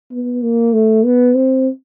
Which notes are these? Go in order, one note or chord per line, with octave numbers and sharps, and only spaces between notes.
B3
A#3
A3
B3
C4